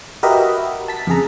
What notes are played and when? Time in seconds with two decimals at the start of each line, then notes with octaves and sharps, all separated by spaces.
0.23 F#4 G4 A#4 B4 D#5 E5
0.88 A5 B6
1.07 F2 C#3 G#4 A#5